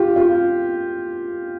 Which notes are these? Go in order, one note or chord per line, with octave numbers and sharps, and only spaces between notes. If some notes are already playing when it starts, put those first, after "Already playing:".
Already playing: F4 G4
F4